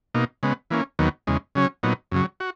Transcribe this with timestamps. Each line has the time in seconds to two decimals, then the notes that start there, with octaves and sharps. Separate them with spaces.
0.15 B2 A#3 D#4
0.43 C#3 G#3 B3
0.71 E3 A#3 C#4
0.99 D#2 D#3 F#3 B3
1.27 E2 C#3 G#3
1.55 C#3 F#3 C#4
1.83 A#2 F#3 B3 D#4
2.12 F#2 C#3 F#3
2.40 F#4